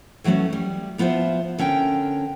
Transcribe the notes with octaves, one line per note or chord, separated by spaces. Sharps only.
E3 F#3 A3 B3 C#4
G3
F3 B3 F4 C5 E5
D3 C#4 A#4 G5